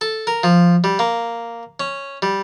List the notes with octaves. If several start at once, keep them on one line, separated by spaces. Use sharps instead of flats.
A4
A#4
F3
G3
A#3
C#4
G3